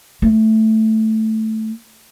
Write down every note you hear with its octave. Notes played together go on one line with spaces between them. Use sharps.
A3